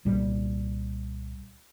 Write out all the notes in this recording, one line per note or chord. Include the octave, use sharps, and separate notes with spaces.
C2 A#2 G3